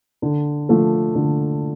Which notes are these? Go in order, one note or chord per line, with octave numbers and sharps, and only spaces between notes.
D3
F3 A3
D3